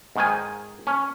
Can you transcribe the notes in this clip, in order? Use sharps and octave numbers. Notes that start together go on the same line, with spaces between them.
G#2 D#3 G#5
C#4